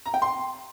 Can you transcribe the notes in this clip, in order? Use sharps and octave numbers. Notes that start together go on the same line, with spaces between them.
A#5
G5
C6